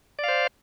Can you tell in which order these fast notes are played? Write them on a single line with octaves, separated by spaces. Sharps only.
D5 F5 C5